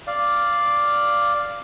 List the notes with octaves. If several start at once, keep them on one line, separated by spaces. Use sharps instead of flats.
D5 F5